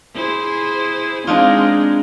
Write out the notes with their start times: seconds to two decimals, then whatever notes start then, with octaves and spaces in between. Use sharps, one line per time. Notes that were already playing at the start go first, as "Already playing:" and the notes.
0.15 E4 G#4 C5
1.27 G#3 C4 D4 D#4 F4